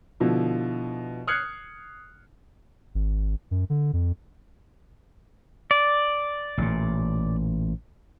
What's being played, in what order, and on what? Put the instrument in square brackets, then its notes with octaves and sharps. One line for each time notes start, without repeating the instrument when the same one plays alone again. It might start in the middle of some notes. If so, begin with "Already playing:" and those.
[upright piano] B2 D3 F3 E4
D#6 F6 F#6 G#6 C7 C#7
[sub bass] G#1
F#2
D3
F2
[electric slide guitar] D5
[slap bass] A1 A#2